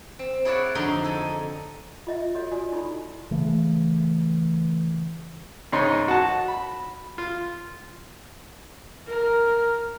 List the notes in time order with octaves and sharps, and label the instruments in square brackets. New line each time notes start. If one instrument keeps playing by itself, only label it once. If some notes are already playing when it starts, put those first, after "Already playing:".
[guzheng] C4
E4 G#4 C#5 D5 F5 F#5
F2 D3 D#4 F#4 C5 C6
A4 G#5
[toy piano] F4 D#5 E5
F#4 A4 C#5 D#5
F4 F#4 D5 G#5 D#6
D#4 E4 F#4 A4 B5
[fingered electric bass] C#3 E3 A3
[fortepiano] G#2 C#3 D#4 C#5 C6
F#4 A5
B5
F4
[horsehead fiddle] A#4